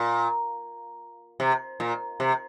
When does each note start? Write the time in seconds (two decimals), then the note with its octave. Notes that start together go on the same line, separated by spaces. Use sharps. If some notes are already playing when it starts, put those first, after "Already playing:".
Already playing: A#2
1.40 C3
1.80 A#2
2.20 C3